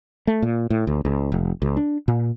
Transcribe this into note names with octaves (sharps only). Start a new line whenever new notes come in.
A3
A#2
A2
D2
C#2
F1
C#2
D4
A#2